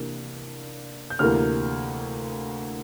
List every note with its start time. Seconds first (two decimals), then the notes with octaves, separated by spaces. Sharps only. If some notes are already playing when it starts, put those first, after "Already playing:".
Already playing: C3 E3 A#3 D4
1.10 G6
1.19 D2 C3 E3 A#3 F6